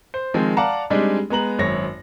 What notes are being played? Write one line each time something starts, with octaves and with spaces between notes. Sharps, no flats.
C5
D#3 F3 G#3 C4
D5 F5 F#5 A5 A#5
G3 G#3 C4 D4 D#4
G#3 B3 A#5 F#7
G#1 F#2 C#5 A#6